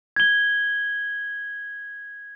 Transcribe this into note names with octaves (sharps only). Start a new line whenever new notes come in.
G#6 G7